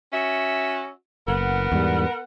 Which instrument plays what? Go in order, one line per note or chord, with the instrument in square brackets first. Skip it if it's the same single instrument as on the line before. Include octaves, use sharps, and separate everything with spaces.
[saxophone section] C#4 F#4 E5
[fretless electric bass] F#1 [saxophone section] B3 A#4 F#5
[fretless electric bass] E2 G#2 G3